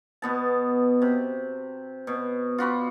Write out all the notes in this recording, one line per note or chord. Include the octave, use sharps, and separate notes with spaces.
B2 B3 A5
C3
B2
F4 F#4 B5 D6